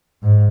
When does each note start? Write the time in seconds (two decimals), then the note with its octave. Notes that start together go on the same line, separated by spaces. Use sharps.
0.23 G#2